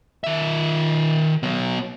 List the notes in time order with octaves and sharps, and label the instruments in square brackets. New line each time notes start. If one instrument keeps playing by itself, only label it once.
[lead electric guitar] D#3 E5
F#3 B3